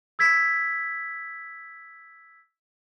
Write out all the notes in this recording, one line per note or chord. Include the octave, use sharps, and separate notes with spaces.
E6 G#6 B6